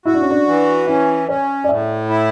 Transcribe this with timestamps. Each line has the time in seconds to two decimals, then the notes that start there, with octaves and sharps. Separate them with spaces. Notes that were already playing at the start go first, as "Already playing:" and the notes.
0.06 E4 F#4
0.14 D4
0.22 C#4
0.30 D4
0.47 E3
0.87 C#4 E4
1.28 C#4 C#5
1.64 D5
1.69 A2 E5
2.09 E4